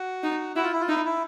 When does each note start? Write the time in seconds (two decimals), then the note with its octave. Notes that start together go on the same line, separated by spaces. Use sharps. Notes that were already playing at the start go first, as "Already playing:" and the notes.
Already playing: F#4
0.23 D#4
0.56 E4 F#4
0.63 F4
0.73 E4
0.81 F4
0.88 D#4 E4
1.05 E4